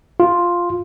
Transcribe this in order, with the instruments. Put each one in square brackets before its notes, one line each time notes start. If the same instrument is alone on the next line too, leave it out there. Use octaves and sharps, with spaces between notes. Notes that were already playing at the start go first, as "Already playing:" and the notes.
[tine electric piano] F4